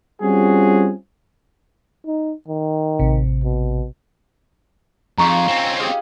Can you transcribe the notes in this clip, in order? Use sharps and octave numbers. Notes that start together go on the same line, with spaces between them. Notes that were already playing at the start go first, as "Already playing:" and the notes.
G3 C4 C#4 F4 F#4 G#4
D#4
D#3
A1 C3
B2
F2 G#3 D#4 F4 A#5 C#6
C4 C#4
G4 G#4 F5